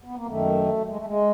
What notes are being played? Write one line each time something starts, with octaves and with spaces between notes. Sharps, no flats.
B3
A#3
F#2 D#3 A3
G#3
A3
G#3